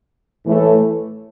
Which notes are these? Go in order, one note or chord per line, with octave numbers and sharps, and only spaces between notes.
A2 E3 A3